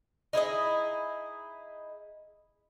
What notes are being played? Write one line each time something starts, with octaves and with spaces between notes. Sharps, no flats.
D#4 E4 G#4 D#5